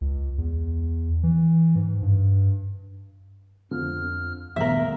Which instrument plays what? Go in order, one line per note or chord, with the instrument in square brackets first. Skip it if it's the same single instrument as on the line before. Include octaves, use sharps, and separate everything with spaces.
[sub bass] C#2
E2
E3
G#2
G2
[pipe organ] F2 F6 [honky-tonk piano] D3 F3
[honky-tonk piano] D2 G2 [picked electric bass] A#2 D#3 F3 [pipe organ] B3 [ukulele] A#4 E5